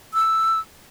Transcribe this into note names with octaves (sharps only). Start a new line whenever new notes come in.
E6